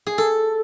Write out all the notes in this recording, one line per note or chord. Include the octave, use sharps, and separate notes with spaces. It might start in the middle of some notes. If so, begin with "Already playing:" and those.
G#4
A4